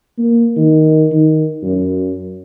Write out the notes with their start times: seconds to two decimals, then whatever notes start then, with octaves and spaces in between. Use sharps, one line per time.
0.18 A#3
0.56 D#3
1.12 D#3
1.63 F#2